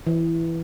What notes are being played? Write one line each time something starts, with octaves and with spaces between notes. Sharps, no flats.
E3